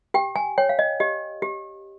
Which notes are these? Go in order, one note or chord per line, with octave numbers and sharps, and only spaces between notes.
G4 G5
G#5
C#5 G5
F5
D#5
G4 D#5
G4